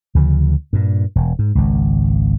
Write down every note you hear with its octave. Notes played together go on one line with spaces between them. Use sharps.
D2 C#3 E3 F3
G2 A#2
E1
G#2
G#1 C#2